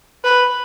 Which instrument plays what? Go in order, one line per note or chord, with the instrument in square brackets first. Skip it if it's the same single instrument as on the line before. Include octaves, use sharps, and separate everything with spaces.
[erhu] B4